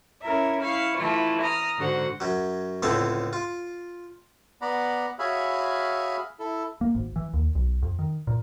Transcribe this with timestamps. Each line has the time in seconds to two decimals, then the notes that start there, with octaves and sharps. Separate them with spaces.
0.22 C#4 E4 A#4 E5
0.61 E4 F5 C#6
0.97 E3 A3 E4 F4
1.42 A#5 D#6 F6
1.77 G#2 D3 F#4 C5 F#5
2.20 F#2 F#3
2.83 C#2 A2 D3 C4 A4 F5
3.33 F4
4.62 B3 D5 F#5 A#5 B5
5.19 F#4 G#4 C#5 E5 F5 B5
6.40 E4 A4
6.81 A#3
6.95 G#1
7.16 E3
7.34 D#2
7.55 B1
7.82 F2
7.99 D#3
8.27 A#2